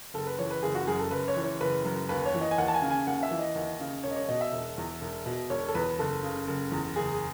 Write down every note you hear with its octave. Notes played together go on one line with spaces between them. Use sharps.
F#1 A4
B4
E3 C#5
B4
F#1 G#4
F#4
F#2 G#4
A4
F#1 B4
C#5
E3
C#5
F#1 B4
F#2
D#2 B4
C#5
E3
D#5
G#5
D#2 F#5
A5
G#5
C#3
G#5
D#2 F#5
E5
E3
D#5
D#2
C#3
E1 C#5
D#5
C#5
B2 D#5
E5
E1
E2
E1
B2
E1 C#5
A4
E2 B4
F#1 A4
C#3
F#1
E2
F#1 G#4